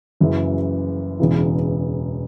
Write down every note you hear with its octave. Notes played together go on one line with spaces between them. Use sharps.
F#1 F#2 C#3 E3
E1 E2 C#3 E3